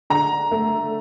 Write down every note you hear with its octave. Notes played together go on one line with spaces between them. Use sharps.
D3 A#5
A3